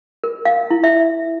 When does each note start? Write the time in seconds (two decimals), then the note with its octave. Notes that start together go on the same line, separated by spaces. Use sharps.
0.24 A#4
0.45 F5
0.71 E4
0.84 E5